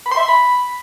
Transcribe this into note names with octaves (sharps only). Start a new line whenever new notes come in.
B5
C6
E5
C6
B5